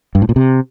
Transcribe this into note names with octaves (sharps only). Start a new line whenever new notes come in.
G2
A2
A#2
C3